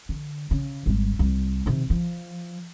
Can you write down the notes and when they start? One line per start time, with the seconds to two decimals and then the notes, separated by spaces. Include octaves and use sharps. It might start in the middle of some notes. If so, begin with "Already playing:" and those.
0.09 D3
0.51 C#3
0.86 G#1 G3
1.19 C2
1.66 C3 D#3
1.90 F3